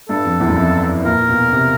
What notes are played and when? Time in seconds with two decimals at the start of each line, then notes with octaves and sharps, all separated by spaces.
0.09 G2 A4
0.25 F2
0.40 E2
0.49 F#2
0.57 F2
1.05 A#2 A#4
1.29 B2
1.52 C3